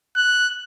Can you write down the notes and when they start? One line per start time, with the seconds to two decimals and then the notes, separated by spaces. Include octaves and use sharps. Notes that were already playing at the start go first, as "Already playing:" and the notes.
0.16 F#6